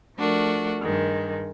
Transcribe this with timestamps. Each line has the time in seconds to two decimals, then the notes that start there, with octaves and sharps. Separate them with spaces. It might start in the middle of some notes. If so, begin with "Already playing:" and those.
0.17 F3 A3 D4 F#4 A#4
0.82 G2 D#3 G#3